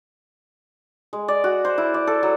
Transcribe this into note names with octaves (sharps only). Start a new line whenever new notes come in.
G#3
D5
F#4
C5
E4
D5
A4
F#3